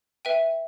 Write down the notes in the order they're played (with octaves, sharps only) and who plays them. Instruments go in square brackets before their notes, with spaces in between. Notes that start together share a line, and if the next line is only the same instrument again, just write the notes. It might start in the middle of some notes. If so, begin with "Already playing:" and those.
[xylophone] B4 E5 G5 D#7